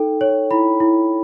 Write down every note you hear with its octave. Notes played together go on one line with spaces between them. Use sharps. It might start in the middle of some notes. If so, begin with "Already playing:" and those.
Already playing: D#4 A4 G5
C#5
E4 B5
E4